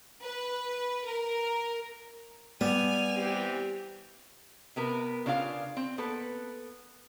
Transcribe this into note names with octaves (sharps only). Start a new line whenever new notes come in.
B4
A#4
G3 B3 G#5 F7
E3 C4 G4
C3 B3 A#4 B4
C#3 D4 F4 A4 F5
C4
A#3 B3 A4 B4